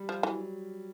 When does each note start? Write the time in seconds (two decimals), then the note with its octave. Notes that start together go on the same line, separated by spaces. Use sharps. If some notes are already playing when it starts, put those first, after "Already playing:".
Already playing: G3
0.09 F3
0.23 E3 F#3